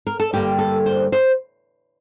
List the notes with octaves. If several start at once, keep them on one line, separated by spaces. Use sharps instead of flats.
A#4
A4
G2 D3 G3 A#3 G4
A4
C5
C5